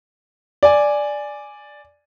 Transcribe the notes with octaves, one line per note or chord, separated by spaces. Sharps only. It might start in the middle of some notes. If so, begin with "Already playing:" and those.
D5 G#5